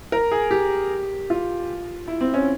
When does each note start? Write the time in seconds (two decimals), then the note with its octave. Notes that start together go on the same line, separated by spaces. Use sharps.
0.12 A#4
0.31 G#4
0.51 G4
1.30 F4
2.08 E4
2.21 C4
2.34 C#4